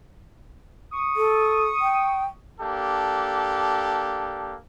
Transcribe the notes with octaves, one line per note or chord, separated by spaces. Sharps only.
C#6 D#6
A4
G5
A#3 D4 G4 A4